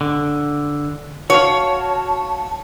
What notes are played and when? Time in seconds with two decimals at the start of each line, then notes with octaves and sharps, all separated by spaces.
0.01 D3
1.30 F#4 C#5 F5 A5